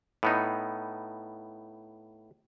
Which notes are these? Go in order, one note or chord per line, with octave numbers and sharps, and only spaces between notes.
A2 B3 D#4